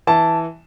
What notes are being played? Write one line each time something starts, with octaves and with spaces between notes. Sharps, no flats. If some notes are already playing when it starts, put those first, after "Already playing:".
E3 A5